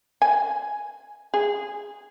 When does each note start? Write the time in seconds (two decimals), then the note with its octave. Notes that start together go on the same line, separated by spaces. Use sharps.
0.22 G#5
1.34 G#4